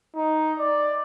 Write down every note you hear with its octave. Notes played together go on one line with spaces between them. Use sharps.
D#4
D5